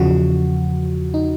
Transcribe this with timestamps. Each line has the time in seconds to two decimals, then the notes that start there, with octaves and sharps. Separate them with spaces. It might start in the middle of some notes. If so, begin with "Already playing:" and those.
Already playing: E2 C#3 F3 F#4
1.14 D#4